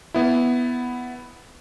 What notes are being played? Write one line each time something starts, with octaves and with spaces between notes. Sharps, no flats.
B3 E4